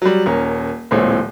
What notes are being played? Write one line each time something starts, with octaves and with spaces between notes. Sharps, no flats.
F#3 G3
D#1 C#4 A#4
D1 A#2 E3 G#3 C4 C#5